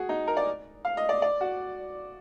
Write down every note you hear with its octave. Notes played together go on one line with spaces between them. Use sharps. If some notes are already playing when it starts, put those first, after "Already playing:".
Already playing: F#4 G#4
D#4
A#4
D5
F5
D#5
D5
D5
F#4